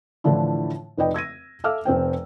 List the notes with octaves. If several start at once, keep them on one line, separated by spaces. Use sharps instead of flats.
A2 D3 E3 F3 D4 E4
F1 D#4 B4 D5 D#5 G5
E6 G#6 A#6 D#7
A4 E5 F5 D6 E6 F6
F1 C4 C5 G5